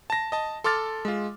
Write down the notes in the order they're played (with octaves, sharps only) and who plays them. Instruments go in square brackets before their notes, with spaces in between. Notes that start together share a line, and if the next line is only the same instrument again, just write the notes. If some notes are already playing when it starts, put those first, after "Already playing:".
[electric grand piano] A5 A#6
D#5 A5
A4 C6 D6 F6 A6
G#3 F4